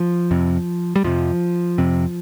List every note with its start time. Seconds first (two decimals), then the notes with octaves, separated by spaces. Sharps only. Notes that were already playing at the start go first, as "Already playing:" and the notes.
Already playing: F3
0.31 F2 C3
0.96 G3
1.04 F2 C3 F3
1.78 F2 C3